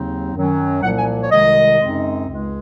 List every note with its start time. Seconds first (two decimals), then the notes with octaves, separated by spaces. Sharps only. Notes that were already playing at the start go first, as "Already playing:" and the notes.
Already playing: D#2 C#3 F#3 C4 D#4
0.34 F#2 D#3 F#3 C#4
0.83 C2 A#2 F3 A#3 F#5
0.98 G#5
1.21 C#5
1.31 C2 C3 D#3 G#3 D#5
1.80 F#2 C#3 G#3 C4 D#4
2.28 C#2 C#3 G#3